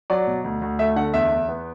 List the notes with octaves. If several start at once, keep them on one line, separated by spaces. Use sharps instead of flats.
F#3 D5
B2
D2
D2
A3 E5
D3 F#5
E2 E5
E2
B3